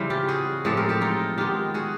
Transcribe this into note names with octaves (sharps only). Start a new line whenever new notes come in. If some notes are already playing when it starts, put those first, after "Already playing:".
Already playing: C#3 E3 G3 C4
F4 G4
F#4 G#4
A2 F3 G#3 C4 G4 A4
G#4 A#4
G4 A4
D#4 F4
D#3 G#3 B3 F4 G4
F#4 G#4